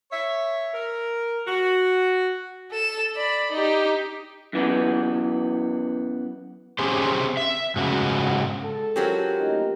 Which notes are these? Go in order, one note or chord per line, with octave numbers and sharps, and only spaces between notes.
C#5 E5
A#4
F#4
A4 E7
D5 B5
D#4 G4
F#2 E3 B3
C4 C#4 G4 G#4 C5
E5
G#2 C#3 F#4
G#3 A4
F#3 C4 C#4 F4 G4 A#4
A1 A#3 D#4